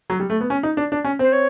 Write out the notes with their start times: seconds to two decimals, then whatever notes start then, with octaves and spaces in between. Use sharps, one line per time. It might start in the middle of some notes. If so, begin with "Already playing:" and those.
0.10 F#3
0.20 G3
0.30 A3
0.41 B3
0.50 C#4
0.63 D#4
0.77 D4
0.92 D4
1.04 C#4
1.19 C4 C5
1.32 C#5